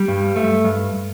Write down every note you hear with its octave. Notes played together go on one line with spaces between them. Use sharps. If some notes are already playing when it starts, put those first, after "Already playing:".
Already playing: G3
G2
A3
G2